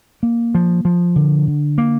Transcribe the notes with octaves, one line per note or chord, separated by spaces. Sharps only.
A#3
F3
F3
D3
D3
A#3